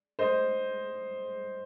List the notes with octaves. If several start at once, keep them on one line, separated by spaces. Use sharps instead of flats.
C5 D#5